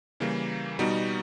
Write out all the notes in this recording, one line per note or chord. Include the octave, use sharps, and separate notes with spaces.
C#3 E3 G3 A#3
B2 G3 B3 D#4 F#4